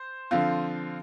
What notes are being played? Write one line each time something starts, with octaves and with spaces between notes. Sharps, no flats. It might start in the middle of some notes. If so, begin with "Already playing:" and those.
Already playing: C5
D3 F3 C4 F4